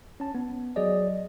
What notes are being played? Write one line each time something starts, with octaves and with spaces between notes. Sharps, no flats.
C#4 A5
B3
F#3 G#4 D5 D#5